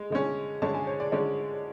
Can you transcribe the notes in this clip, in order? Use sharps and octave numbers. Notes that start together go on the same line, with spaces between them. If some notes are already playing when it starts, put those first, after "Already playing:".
Already playing: G#3
D3 G#3 C#4
D3 G#3 C#4 A5
G#5
C#5
D5
D3 G#3 C#4 D5